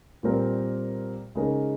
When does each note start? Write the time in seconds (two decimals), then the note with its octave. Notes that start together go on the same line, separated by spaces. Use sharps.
0.23 A#2 G3 C4 G4 A#4
1.35 C#3 G#3 D#4 A#4 C#5